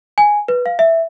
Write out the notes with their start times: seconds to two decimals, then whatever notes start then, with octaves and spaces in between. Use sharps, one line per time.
0.18 G#5
0.48 B4
0.66 F5
0.79 E5